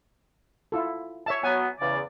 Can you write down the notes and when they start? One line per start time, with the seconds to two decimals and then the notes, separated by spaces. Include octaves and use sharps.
0.72 E4 F4 A4
1.26 C#5 E5 A5
1.43 F#3 B3 G#5
1.79 E2 C#3 D5